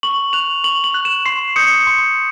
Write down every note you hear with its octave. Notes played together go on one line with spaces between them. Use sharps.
C#6 F#7
F#6 F7
C#6 F#7
F#7
F#6
E7
C6 C7
D#6 G6 C#7
C6